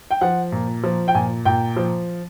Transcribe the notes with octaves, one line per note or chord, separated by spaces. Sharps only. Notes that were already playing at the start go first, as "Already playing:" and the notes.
G5
F3 F#5
A#2
F3
G5
A#2 G#5
A#2 G5
F3